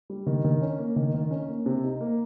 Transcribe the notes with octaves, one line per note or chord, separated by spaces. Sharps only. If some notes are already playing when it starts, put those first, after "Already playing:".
G3
D#3
D#3
C#4
A#3
D#3
D#3
C#4
A#3
C3
D#4
A#3